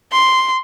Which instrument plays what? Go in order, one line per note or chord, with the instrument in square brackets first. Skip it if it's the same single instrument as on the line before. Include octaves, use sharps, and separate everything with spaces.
[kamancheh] C6